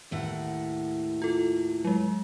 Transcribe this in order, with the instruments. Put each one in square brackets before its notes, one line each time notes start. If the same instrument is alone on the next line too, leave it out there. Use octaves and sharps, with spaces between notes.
[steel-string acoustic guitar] D#2 A2 F#5
[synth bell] F4 A4
F#3 G#3